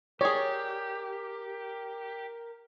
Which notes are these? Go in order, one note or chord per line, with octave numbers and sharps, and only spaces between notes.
G4 G#4 A#4 C#5 D5